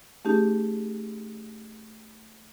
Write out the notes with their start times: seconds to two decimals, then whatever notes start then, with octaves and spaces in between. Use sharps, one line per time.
0.25 A3 C#4 D#4 G4 G#4